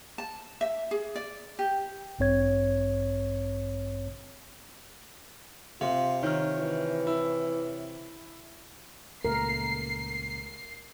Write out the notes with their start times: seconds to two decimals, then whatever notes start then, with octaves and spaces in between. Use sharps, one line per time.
0.18 A5
0.61 E5
0.91 G#4
1.16 D5
1.59 G4
2.19 A1 G2 C4 C#5 G#6
5.81 C3 F4 F5 C6
6.23 D#3 C#5 F6
6.58 E3
7.07 E4
9.25 C#2 A#2 A3 A#4 C7